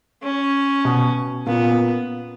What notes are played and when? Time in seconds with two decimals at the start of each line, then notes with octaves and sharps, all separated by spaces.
0.23 C#4
0.85 B2
1.46 A#2 B3